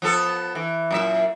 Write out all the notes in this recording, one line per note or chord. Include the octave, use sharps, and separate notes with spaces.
F3 B3 A4
E3
F#2 A#2 E5